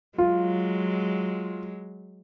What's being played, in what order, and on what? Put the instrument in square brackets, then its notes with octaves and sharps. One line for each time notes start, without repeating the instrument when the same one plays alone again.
[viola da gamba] F#3 G#3 [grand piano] F4